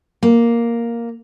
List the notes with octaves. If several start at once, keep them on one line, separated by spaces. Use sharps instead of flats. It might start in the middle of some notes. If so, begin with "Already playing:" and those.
A#3